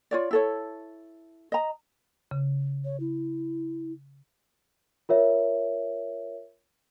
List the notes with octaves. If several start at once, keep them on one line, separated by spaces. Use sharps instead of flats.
F4 C#5 D5
E4 A4 C#5
D#5 A#5
C#3
C#5
E4
F4 A#4 C#5 E5